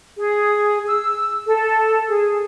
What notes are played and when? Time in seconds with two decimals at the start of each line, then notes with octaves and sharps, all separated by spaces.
0.17 G#4
0.87 E6
1.45 A4
2.08 G#4